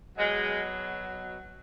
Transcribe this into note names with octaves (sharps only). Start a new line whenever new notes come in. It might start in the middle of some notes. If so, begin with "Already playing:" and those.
B2 F#3 G#3